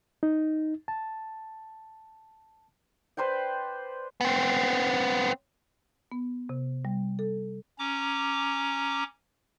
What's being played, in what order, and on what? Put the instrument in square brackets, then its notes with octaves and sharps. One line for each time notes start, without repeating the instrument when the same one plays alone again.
[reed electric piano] D#4
A5
[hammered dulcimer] B4 C5 D5 G5
[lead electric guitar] B3 C4
[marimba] B3
C3
G3
A4
[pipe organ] C#4 A#5 D6